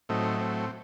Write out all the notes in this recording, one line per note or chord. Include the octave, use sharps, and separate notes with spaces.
A2 F#3 A3 C4 D#4
C4